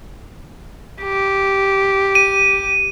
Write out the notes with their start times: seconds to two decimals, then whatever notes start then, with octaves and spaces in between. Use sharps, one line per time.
1.02 G4
2.15 D#7